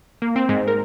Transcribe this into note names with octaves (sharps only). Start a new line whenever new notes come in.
A#3
C4
G#2
A#4